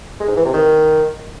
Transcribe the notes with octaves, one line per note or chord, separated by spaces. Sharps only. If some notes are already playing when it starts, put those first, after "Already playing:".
G#3
G#2
E3
C3
D#3